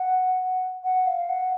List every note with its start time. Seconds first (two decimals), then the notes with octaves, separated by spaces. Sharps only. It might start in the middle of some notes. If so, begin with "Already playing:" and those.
Already playing: F#5
0.84 F#5
1.06 F5
1.29 F#5